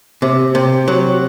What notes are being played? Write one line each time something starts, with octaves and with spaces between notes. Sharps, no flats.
C3
C3
F#3